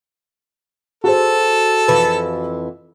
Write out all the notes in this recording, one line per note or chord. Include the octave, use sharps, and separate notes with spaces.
F#4 G#4 A4 C5
F2 E3 B4